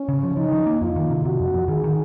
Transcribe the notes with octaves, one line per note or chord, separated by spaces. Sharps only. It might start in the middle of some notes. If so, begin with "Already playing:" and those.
Already playing: C#4
C#3
F3
F3 D#4
F3
A#3
F2 F4
D#3
C3
C3 F#4
F2
F2
D#3 G#4
D#3